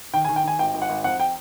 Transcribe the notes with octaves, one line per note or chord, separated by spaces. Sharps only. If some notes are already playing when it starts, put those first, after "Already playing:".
D#3 G5
G#5
D#3
G5
D#3 G#5
G#1 G5
G#1
F#5
G#1
F2 F#5
G5